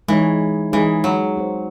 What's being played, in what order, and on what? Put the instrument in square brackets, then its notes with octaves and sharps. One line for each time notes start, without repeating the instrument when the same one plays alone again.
[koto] E3 [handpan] G#3 D#4 G#4 C#5
[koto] E3 [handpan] G#3 D#4 G#4 C#5
[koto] F#3
[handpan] C4 F#4 C5